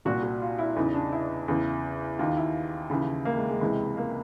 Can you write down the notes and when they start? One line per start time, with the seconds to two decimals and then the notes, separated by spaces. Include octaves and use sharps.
0.05 C2 A#2 F#4
0.23 F#4
0.42 F4
0.59 E4
0.76 E2 C#3 E3 D#4
0.94 D4
1.12 E4
1.48 E2 C#3 E3
2.19 D#2 D#3 F4
2.37 E4
2.90 D#2 C#3 E3
3.25 A#3
3.37 G#3
3.50 G#3
3.61 C#2 C3 E3 G#3
3.97 A#3